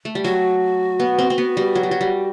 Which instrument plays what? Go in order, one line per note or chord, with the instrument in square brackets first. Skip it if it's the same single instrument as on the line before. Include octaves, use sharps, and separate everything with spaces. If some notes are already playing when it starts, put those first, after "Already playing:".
[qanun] A3
G3
[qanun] F#3 [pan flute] F#4
[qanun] B3
C4
C4
B3
G3
F#3
G3
F#3
G3